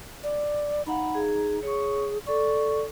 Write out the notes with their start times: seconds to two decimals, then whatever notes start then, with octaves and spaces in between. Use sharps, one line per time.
0.24 D5
0.87 D#4 F5 F#5 B5
1.15 G#4
1.63 G#4 C#5 C#6
2.27 A4 D5 C#6